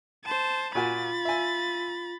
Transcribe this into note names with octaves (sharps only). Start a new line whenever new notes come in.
C5 A5
A#2 F4 F#4 G#5 B5 A6
E5 G#5